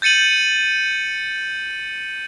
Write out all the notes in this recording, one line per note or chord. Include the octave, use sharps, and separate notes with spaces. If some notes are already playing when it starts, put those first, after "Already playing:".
G6 A6 C#7 D#7 F#7